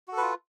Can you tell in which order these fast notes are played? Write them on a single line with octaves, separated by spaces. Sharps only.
F#4 A4 B4 F4